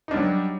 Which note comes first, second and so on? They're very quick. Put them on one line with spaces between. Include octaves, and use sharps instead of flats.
D#4 D4 G3 F#3